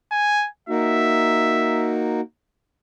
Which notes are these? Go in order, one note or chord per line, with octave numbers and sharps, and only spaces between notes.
G#5
A#3 D#4 F#4 E5